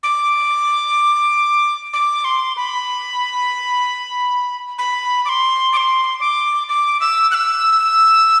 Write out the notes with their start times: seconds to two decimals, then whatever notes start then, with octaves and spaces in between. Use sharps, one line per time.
0.03 D6
1.93 D6
2.25 C6
2.57 B5
4.78 B5
5.25 D6
5.29 C6
5.73 D6
5.77 C6
6.20 D6
6.69 D6
7.01 E6
7.31 F#6
7.34 E6